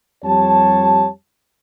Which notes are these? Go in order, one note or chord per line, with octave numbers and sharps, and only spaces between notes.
F2 G3 G4 C#5 A5